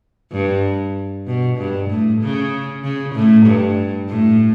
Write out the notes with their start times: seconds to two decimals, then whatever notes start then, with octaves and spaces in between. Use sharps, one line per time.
0.32 G2
1.27 B2
1.58 G2
1.89 A2
2.21 C#3
2.83 C#3
3.15 A2
3.46 G2
4.09 A2